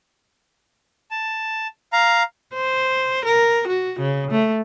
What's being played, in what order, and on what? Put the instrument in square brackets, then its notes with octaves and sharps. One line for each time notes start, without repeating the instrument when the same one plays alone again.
[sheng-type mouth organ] A5
F5 A#5
[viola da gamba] C5
A#4
F#4
C#3
A3